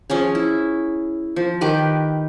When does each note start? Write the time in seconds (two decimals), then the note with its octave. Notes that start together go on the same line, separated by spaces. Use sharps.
0.10 F3 C#4 G#4 C#5
0.35 E4
1.36 F3
1.61 D#3 G4 B4